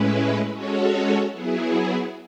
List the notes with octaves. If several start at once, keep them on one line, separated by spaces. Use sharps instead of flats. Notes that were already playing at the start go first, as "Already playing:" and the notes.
Already playing: A2 G#3 C#4 E4 B4
G#3 C#4 F#4 A4 C#5
F#3 B3 E4 G#4